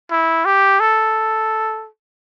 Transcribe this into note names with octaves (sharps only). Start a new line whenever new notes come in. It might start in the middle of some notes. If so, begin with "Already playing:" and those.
E4
G4
A4